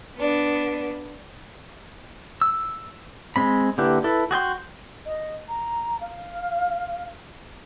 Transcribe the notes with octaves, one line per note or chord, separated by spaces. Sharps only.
B3 D4
E6
G#3 C4 B5
D3 A#3 E4 G4 B4
E4 A4 B4
F#4 G#4 G5 C6
D#5
A#5
F5